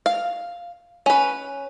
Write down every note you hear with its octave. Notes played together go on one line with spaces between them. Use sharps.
F5
C#4 B4